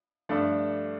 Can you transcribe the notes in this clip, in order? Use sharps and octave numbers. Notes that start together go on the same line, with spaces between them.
G2 F3 A3 D4 A4